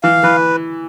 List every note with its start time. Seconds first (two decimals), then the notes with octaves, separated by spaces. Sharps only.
0.03 E3 F5
0.23 E3 B4